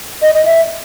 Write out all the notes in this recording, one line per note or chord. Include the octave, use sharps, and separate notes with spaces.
D#5
D#5
E5